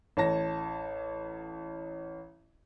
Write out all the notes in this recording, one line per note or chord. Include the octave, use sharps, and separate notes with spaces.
A1 C#5 A5 A#6